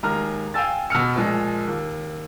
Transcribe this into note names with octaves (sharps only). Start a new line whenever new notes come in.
D#2 G#3 A#5 F6
F5 G5 G#5 E6 A6
B2 E6 F6 C#7
A#2 F3 G#3
D#2